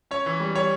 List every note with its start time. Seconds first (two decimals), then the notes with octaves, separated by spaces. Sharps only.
0.11 C#4 C#5
0.26 E3
0.40 G3
0.55 G3 C#5